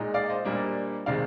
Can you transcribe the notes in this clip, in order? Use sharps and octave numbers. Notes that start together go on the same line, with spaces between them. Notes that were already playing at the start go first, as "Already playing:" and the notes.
Already playing: A#2 G#3 D#4
D5 F5
C5 D#5
A#2 G3 A#3 D4
C3 D#3 G#3 D5 F5